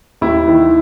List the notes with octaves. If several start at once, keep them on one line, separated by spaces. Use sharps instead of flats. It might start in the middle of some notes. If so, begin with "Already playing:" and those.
D#2 E4
D#3